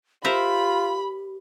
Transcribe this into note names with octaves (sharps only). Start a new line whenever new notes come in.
F4 G4 A#4 C5 E5 B5